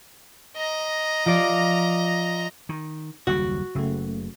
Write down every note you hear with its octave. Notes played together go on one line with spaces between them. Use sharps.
D#5 A#5
F3 F4 D5
D#3
F#1 D#2 G3 F#4
F#1 C#3 A3